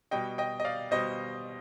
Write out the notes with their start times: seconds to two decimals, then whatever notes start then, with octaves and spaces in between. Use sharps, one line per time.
0.11 B2 G3 D#5 G5
0.38 D#5 G5
0.60 D#5
0.64 D5 F5
0.91 B2 G3 C5 D#5